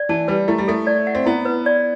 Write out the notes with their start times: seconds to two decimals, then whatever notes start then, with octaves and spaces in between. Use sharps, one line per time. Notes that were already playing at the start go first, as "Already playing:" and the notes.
Already playing: D5
0.09 E3 A5
0.28 G3 B4
0.48 A3 E4
0.58 G3
0.68 A3 A4
0.87 D5
1.07 F#5
1.15 C4
1.26 B3 E4
1.45 B4
1.66 D5